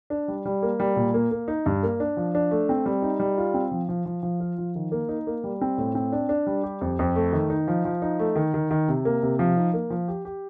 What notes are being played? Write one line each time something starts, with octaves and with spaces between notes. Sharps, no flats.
D4
G3
G3
A#3
G3
A#2
A#3
A#3
D#4
G2
A#3
D4
F3
D4
A3
C4
G3
D#4
G3
F4
C4
F3
F3
F3
F3
F4
F3
D#3
A#3
D#4
A#3
G3
C4
A2
C4
D4
D4
G3
G4
F2
F2
A3
D#3
D#4
F3
F3
D#4
A3
D#3
D#3
D#3
C3
A#3
C3
F3
D#4
A#3
F3
G4
G4